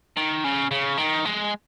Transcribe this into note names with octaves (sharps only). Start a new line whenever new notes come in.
D#3
C#3
C#3
D#3
G#3